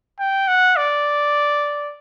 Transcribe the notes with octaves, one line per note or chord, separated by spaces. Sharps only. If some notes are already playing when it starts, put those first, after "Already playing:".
G5
F#5
D5